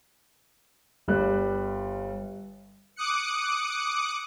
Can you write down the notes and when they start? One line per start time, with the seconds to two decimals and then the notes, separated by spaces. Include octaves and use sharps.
1.08 G1 G3 F#6
2.96 D6 D#6 F#6 C#7